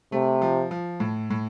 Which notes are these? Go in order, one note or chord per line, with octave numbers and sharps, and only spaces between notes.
C3 A3
F3
F3
A2
A2